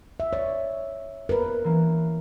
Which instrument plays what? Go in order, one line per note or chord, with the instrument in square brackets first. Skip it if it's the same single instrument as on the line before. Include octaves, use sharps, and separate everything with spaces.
[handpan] E5
[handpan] C#5 [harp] D5 C#6 E6
[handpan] A#4 B4
[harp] E3 A#3 C#4